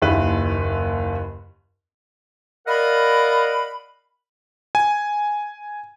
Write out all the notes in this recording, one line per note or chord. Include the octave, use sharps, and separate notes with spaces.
F#1 D#2 E4 B4
A#4 D5 D#5 F5 F#5 B5
G#5